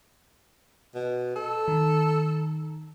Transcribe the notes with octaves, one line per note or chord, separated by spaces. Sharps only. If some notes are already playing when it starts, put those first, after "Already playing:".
B2
A4
D#3